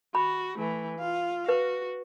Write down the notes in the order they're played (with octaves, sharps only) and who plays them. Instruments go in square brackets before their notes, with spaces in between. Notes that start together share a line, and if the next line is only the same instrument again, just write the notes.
[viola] F#4 [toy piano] B5
[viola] E3 A3
F4 F5
[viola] F#4 [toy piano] B4